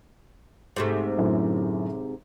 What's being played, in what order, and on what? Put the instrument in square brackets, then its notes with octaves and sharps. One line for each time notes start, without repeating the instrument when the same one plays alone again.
[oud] G#2 C3 A3
[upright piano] F#2 A2 D3